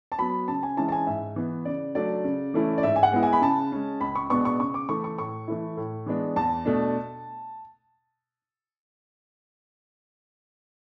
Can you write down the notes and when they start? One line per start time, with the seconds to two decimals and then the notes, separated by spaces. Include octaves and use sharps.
0.12 A5
0.19 F#3 B3 B5
0.48 C#3 A5
0.63 G#5
0.77 E3 G#3 C#4 E4 A5
0.88 A5
0.92 G#5
1.07 G#2 E5
1.36 E3 B3
1.65 C#3 D5
1.95 F#3 A3 D4 D5
2.24 C#3
2.54 E3 A3 C#4 E4
2.78 D5
2.83 G#2 E5
2.96 G#5
3.03 F#5
3.12 G#3 B3 E4
3.23 G#5
3.33 B5
3.41 C#3 A5
3.72 G#3 C#4
4.01 C#2 B5
4.15 C#6
4.30 B2 G#3 B3 D4 C#6
4.45 C#6
4.60 C#3 C#6
4.74 D6
4.89 E3 A3 C#6
5.04 C#6
5.18 A2 C#6
5.48 E3 A3 E4
5.77 A2
6.06 E3 G#3 B3 D4
6.36 E2 A5
6.65 B2 A3 D4